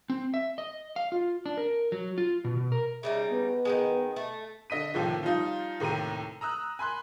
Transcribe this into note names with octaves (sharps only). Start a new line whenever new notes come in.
C4
E5
D#5
F5
F4
D4
A#4
F#3
F4
B2
B2
A#4
C#3 G3 D#4 E5
B3
D#3 E3 G#3
A3
D3 D#5 B6 D#7
D#2 A2 C3 F3
F3 G3 D#4 F4
D#2 A2 C3 A#5 D#7
A#5 D#6 E6 F#6
G#5 B5 C6 F#6